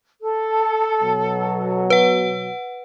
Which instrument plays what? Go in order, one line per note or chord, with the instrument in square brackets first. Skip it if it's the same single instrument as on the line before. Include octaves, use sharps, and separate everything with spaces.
[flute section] A4
[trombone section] B2 F#3
[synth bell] B4 F#5